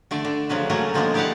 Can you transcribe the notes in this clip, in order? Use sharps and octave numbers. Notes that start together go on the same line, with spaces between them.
D3 A3 D5
D3
C#3 F3 F#3 B4
F#3 A3 A#3 C#4 F#4
B2 D3 F3 G3 G#3 A#3
E4 G4 C5 D5 F5 F#5